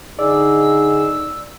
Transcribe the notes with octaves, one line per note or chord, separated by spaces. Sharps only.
D3 D#4 G#4 D5 E6